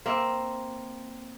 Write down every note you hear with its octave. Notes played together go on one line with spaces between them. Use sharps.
A#3 C4 E5